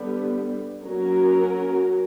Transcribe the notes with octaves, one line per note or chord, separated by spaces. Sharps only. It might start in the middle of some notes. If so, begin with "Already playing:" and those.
Already playing: D3 G3 B3
F#3 A#3 C#4 F#4 A#4